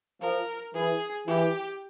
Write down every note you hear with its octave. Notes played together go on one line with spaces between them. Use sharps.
F3 A#4
E3 G#4
E3 G4